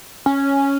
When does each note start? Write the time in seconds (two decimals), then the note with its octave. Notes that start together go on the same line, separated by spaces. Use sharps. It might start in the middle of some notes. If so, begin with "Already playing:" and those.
0.26 C#4